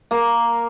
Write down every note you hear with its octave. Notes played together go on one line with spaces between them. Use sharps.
A#3